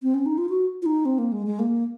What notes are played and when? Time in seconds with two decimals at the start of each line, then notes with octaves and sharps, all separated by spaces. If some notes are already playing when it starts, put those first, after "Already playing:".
0.03 C4
0.14 C#4
0.26 D#4
0.38 F4
0.49 F#4
0.82 F4
0.86 D#4
1.05 C4
1.18 A#3
1.32 G#3
1.47 G#3
1.59 A#3